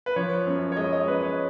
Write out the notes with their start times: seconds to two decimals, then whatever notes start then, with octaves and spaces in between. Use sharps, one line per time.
0.06 B4
0.16 F3 C#5
0.47 F#2
0.72 C#5
0.76 G#3 D#5
0.93 D#5
1.08 F#2 B4
1.23 C#5